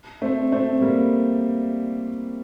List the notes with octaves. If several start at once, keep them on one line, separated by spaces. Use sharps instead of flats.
A3 C4
A3 C4
G3 A#3